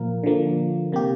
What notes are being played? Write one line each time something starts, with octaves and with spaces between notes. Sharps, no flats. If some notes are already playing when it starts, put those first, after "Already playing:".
Already playing: A#2 F3 A#3 A#4
D3 F3 A#3
C3 A#3 G4